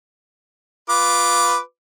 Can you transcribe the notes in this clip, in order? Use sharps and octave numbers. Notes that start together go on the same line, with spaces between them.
F4 B4 D6